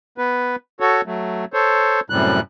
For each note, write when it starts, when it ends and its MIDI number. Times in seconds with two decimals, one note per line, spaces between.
0.18 0.56 59
0.18 0.56 71
0.80 1.01 66
0.80 1.01 69
0.80 1.01 73
1.06 1.45 54
1.06 1.45 57
1.53 2.00 69
1.53 2.00 72
1.53 2.00 73
2.10 2.40 42
2.10 2.40 45
2.10 2.40 48
2.10 2.40 55
2.10 2.40 90